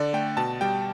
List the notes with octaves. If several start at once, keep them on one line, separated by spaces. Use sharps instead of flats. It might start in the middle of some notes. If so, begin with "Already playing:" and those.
Already playing: D3 D5
A3 G5
B2 A5
G3 G5